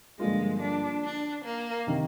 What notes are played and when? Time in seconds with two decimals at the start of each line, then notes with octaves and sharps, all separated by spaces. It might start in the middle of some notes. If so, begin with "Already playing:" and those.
0.20 G2 D3 F3 G#3 A#3 F4
0.61 D4
1.03 D4
1.44 A#3
1.87 C3 D#3